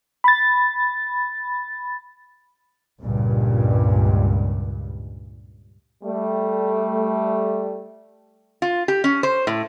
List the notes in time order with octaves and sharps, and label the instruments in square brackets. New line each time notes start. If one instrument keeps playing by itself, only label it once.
[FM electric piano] B5 A6
[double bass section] C#2 G2 A#2
[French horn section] G3 A3
[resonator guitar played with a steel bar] F4
G4
C#4
C5
A2